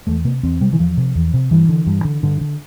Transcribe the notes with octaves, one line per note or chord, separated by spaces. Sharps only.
E2 A3
C3 A#3
E2 C4
C3 G3
E3
E2 F3
C3
E2
C3
G2 E3
D3
G2
D3
G2 D3
D3